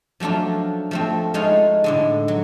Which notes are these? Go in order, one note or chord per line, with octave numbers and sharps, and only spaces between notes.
F3 F#3 A3 D4 F4
F3 A3 C4
G#3 A3 D#4 F4 C#5 F5
A2 D3 G#3
F#3